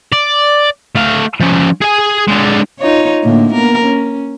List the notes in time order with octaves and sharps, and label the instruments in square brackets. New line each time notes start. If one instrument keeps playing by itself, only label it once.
[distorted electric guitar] D5
A3 F5
F3 C#4
G#4 G#5
D3 G#3
[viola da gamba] D#4 F4 C#5
A2 D3 A#3
A#3 B3 A#4
C#4